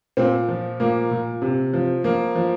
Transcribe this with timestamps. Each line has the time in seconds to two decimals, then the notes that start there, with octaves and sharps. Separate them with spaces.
0.17 A#2 C4
0.49 F3
0.80 A#2 A#3
1.11 A#2
1.42 C3
1.74 F3
2.04 F3 A#3
2.36 F3